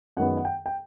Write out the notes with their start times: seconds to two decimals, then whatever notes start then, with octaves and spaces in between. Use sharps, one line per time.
0.17 F#2 D#3 G#3 B3 F#5
0.37 F#5
0.45 G5
0.66 G5